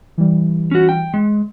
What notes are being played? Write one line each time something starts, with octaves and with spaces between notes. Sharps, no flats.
E3 G3
C#4 F#4
G5
G#3